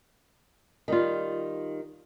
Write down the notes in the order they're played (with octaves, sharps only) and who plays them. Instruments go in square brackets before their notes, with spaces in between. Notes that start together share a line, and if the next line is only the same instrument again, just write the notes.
[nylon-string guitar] D#3 G3 F4